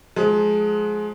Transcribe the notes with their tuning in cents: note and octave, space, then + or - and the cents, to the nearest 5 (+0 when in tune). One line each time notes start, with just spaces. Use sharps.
F3 +30 G#3 +20